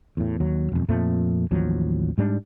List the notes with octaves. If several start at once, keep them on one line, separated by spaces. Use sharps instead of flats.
E2 A2
D#2 F#3
E1 F2
F2 A#2 F3 A3
A1 D#2 F3 F#3
G#2 G3 D4